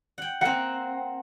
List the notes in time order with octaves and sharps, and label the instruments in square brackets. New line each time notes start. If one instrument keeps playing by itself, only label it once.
[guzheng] F#5 G5
[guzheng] A#3 C4 [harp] F#5